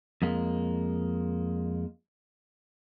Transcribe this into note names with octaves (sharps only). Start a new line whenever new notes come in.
F2 G#3 A#3